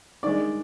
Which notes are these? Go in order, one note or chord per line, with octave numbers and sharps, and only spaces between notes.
G2 D#3 G#3 D5